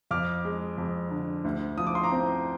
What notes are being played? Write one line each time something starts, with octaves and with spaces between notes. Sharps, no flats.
F2 D6 F6
G#3
F2
D3
D2
F3 D#6
D6
C6
A#5 D6
C4